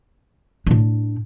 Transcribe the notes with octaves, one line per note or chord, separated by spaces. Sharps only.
A2 D4